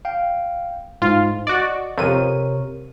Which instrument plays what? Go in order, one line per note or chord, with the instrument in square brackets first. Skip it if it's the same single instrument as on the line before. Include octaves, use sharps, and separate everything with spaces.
[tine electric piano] F5 G5
[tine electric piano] G#2 [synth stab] F4
[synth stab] F#4 D5 [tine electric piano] D#5
[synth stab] F2 D#7 [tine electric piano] C3 A#4 C#5